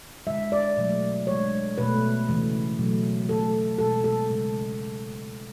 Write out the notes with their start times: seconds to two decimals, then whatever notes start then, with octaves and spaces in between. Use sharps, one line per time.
0.27 G#3 E5
0.30 D3
0.52 D5
0.77 B2 F#3 A3
1.27 D3 G#3 C#5
1.78 B2 A3 B4
2.29 C#3 E3 A3
2.79 B2 F#3 A3
3.29 D3 A3 A4
3.78 B2 G#3 A4
4.04 A4
4.29 C#3 G#3